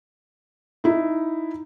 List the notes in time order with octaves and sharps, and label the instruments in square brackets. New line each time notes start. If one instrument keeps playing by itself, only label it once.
[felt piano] D#4 E4